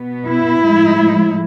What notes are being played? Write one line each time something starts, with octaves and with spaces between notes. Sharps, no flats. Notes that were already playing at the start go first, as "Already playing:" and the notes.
Already playing: B2 B3
E4
A2 F3 G#3